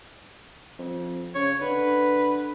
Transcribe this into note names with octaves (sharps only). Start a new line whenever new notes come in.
F2
C#3 C#5
D3 B4